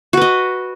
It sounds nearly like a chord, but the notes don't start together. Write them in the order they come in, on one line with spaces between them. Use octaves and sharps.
F#4 B4 D#5